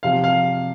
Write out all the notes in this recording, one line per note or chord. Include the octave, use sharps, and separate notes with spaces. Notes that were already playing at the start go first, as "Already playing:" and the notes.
C3 F3 F5
F5